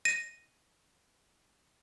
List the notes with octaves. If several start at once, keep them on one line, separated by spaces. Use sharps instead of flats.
A#6 D#7